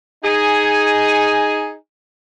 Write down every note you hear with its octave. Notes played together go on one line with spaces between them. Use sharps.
D#4 G#4 G#5